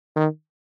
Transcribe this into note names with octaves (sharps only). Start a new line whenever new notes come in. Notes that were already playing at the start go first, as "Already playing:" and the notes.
D#3